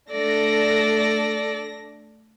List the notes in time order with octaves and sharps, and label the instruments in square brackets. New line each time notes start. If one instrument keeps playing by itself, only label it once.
[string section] A3 D4 A#6 [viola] A4 D5